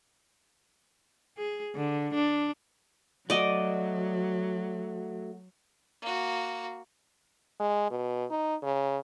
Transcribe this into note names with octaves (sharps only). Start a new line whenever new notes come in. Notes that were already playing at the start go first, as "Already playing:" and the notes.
G#4
D3
D4
F#3 A3 F#4 D5 D#5
A#3 F#4
G#3
B2
D#4
C#3